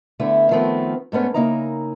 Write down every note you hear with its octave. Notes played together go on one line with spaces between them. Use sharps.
D3 A3 B3 E4
D#3 F3 A3 B3 C4
G#2 A3 B3 C#4
C#3 A#3 D#4 E4 A#5